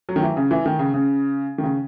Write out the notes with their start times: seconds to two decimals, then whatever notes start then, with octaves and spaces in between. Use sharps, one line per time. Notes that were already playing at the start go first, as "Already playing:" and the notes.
0.09 F#3
0.16 D#3
0.23 E3
0.37 C#3
0.51 E3
0.66 D#3
0.79 C#3
0.94 C#3
1.58 D#3
1.63 C#3